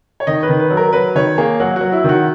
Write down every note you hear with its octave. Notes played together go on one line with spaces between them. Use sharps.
C#5
D#3 D#5
B4
D#3
B4
F#3
A#4
F#3 B4
D#3 C#5
A#3 G#4
F#3 F#4
F#3 F#4
E4
D#3 F#4